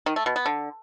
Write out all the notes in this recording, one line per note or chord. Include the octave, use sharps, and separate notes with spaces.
D#3
A3
B2
B3
D3